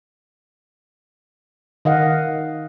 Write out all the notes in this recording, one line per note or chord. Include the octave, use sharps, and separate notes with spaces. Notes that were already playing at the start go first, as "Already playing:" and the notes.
D#3 D#5 F5 F#5